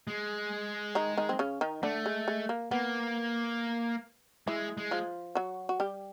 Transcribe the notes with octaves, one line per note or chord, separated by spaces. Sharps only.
G#3
D#3 D#4
D#3 D#4
C4
C#3 C#4
D#3 D#4
D3 A3 D4
G#3
G#3
A#3
A#3 B3
E3 G#3 E4
G#3
F3 F4
F#3 F#4
F#4
G3 G4